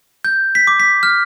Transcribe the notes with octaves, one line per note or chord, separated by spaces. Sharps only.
G6
B6
D6
B6
F6